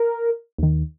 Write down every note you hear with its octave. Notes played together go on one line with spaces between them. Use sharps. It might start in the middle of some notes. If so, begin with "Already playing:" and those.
Already playing: A#4
D#2 D#3